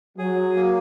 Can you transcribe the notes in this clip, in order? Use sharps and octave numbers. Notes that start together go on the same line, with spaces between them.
F#3 G#4
A#3